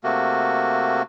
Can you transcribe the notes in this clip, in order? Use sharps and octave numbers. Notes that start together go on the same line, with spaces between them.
C3 A3 A#3 F#4